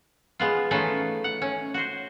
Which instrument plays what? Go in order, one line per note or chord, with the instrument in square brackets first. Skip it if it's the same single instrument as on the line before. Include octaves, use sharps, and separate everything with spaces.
[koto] G#3 B3 F4
E3 A3 C#4 D#4 F4 B4
F#5
C#4
F#4 C5